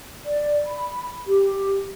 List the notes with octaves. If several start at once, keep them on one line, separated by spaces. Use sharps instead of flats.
D5
B5
G4